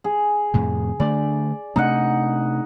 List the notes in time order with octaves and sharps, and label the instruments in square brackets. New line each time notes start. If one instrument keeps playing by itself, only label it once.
[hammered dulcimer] G#4
[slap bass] F2 A2 C3
[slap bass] D3 A3 D4 [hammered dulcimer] D5
[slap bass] C3 A3 D4 [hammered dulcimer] D#4 F#5